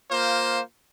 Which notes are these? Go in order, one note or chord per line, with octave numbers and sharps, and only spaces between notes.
A#3 F4 C5